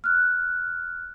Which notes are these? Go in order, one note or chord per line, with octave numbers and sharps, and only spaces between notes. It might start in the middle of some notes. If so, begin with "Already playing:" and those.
F6 F#6